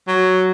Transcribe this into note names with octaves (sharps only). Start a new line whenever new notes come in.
F#3